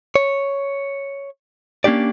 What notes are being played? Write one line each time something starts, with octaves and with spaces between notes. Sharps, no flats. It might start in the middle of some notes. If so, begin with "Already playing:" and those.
C#5
A#3 C#4 D4 G4 D5